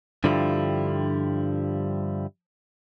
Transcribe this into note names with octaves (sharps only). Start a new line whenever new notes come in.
G2 D3 F3 G3 E4 F4